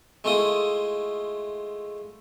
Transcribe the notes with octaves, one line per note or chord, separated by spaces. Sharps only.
G#3 A3 E4 F4 D#6